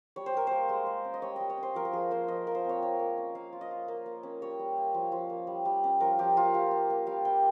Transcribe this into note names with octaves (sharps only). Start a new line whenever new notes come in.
G3 C#5
C5
G3 A#4
A#3 C5
G#3
G#3
C#4
D#5
G3 C#5
G3 D#5
C#5
C#4
C5
F3 A#4
A#4
F3 G#4
A#3 C5
F3 D#5
F3 A#4
C5
C4 C#5
A#3 C#5
A#3
C#4
A#3 F5
F4
D#5
F4
A#3
A#3
C#4
G3 C#5
G3
A#3
F3
F3
A#3
G3
G3
C#4
F3 A#4
F3 G4
A#3 F4
F3 G4
F4
A#3
G3 F5
G3 G5